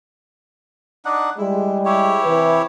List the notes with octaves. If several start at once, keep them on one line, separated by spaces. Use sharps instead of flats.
D4 D#4 F#5
G3 G#3 E4
E4 G4 C#5
C3 E3 B4